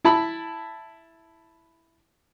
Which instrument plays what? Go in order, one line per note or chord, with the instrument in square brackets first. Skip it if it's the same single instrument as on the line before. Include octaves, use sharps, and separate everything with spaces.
[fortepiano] E4 A5 B5